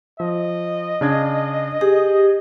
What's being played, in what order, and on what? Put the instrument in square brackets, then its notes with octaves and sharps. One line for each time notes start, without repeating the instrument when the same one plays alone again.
[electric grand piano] F3 [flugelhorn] D#5
[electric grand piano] C#3 D4 G#6
[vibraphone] G4 [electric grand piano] G#4